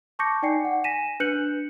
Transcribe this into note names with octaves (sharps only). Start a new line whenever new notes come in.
A5 C#6 D6 G6 A#6 C#7
D#4 D5 G5 G#5 C7 C#7
F#5
G#5 A#6 B6 D#7 E7
D4 B4 F#6 G6 C#7 F#7